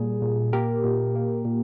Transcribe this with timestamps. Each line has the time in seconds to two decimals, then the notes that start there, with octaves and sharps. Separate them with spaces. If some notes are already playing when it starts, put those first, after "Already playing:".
Already playing: A#2 G3 G#4
0.22 A#2
0.53 A#3 G4 A#4
0.84 A#2
1.15 A#3
1.45 A#2